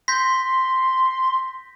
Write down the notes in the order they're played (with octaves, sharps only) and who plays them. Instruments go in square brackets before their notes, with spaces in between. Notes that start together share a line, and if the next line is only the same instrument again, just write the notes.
[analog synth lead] C6 [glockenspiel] G6 A#6 B6